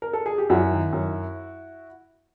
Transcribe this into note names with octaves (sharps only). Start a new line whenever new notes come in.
A#4
A4
G#4
G4
F#2 E4 F#4
D#3
F#2